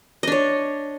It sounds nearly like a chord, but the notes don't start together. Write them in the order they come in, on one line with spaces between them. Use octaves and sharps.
D#5 D4 C#5